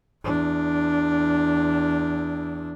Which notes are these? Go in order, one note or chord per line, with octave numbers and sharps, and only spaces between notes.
E2 D4